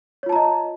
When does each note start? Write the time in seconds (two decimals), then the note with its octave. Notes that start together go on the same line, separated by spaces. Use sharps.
0.23 C#5
0.26 F4
0.29 A5
0.33 A#5
0.36 D#5